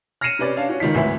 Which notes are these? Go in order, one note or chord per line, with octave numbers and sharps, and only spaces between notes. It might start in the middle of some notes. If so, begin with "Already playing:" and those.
F6 A#6 C7 C#7 D#7 E7
C3 C#4 B4 D5
C#4 D4 F5
C#4 F#4
C#2 D#3 F4 B6
G#1 D2 E3 B4 E5